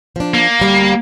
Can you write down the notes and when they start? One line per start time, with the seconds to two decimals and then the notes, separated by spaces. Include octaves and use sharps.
0.16 F3 D4
0.34 A#3
0.60 D2 G3 F5